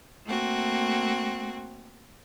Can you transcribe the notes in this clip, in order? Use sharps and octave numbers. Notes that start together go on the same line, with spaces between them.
A3 A#3 C4 F#4